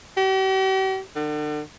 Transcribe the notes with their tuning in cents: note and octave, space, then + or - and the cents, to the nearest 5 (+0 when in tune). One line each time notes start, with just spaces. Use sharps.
G4 -45
D3 +40